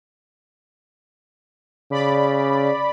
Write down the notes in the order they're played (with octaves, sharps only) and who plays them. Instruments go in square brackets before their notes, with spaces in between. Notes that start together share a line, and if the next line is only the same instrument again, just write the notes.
[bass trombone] C#3 [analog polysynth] D5 B5